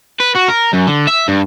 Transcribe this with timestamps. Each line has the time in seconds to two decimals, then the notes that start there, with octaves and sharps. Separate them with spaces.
0.20 B4
0.36 F#4
0.49 A#4
0.73 F#2
0.87 D3
1.07 E5
1.28 G2